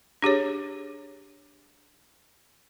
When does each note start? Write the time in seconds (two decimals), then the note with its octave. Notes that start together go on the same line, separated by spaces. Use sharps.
0.22 D4 G4 G#4 C#5